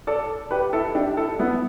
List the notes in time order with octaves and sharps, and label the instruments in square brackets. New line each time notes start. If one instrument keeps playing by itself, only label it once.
[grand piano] A4 D5
G4 B4
E4 A4
D4 G4
E4 A4
B3 E4